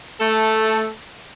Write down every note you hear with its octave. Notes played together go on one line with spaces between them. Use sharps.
A3 A4